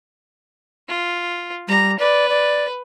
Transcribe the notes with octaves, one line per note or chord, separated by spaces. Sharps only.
F4
G3 A#5
B4 D5
D5